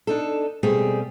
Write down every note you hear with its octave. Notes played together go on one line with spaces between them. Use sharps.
D4 D#4 A4
B2 G3 A3 C4 G4 G#4